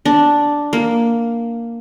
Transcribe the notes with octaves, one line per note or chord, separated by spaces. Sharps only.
D4
A#3